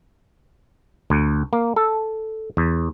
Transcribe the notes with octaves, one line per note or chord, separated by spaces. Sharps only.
D2
A#3
A4
E2